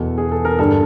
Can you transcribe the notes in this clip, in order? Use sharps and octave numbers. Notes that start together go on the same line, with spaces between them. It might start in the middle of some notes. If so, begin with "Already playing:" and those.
Already playing: E2 B2 A4
G#4
A4
A#4
G2 D3 A4